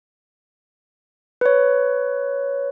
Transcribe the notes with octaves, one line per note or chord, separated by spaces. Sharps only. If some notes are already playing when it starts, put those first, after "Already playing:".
B4 C#5